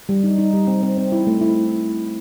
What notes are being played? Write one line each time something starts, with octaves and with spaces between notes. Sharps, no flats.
G3
D#4
D#4
G3
C4
C4
C4
E4
A3
E4